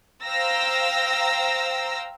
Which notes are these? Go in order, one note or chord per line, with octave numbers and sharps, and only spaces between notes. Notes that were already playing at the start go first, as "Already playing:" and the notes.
C5 F5 G5 A#5 E6 A#6